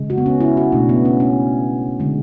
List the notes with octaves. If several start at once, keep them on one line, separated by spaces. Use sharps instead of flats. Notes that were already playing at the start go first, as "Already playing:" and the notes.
Already playing: C#3 G#3
F#4
B3
C#4
E4
F#4
B2 A3 D4
B3
C#4
C#4
D3 G#3